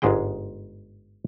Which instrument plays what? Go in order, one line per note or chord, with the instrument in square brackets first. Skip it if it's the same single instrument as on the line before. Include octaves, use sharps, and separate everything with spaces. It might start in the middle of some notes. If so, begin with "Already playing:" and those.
[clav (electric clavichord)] G1 G#2 G#3 G#4 G5